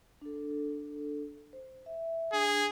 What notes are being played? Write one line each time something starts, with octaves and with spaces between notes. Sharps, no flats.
D4 A4
C5
E5
D4 G#4